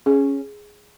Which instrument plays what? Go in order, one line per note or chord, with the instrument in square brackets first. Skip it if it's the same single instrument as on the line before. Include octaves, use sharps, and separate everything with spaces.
[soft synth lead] C#4 [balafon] G#4